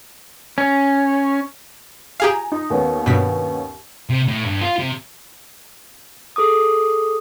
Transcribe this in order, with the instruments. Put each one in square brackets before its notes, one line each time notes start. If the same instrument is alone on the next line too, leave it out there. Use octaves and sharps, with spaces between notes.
[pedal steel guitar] C#4
[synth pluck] G4 G#4 F5 [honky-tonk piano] G#5 A#5
[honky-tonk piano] D#4
D#2 B3 C#4
[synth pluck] G2 B2 B6
[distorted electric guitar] C3
A2
G2
F4
C3
[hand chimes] G#4 A4 D6 D#6